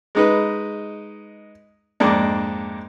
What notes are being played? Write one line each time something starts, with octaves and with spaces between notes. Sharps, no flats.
G#3 D#4 B4
F2 G#2 A#3 D4